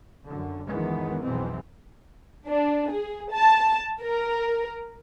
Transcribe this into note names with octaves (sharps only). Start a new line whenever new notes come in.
F#2 D3
C#2 F#2 D#3 E3 G#3 B3
B1 F2 B2 E3 G#3 C4
D4
G#4
A5
A#4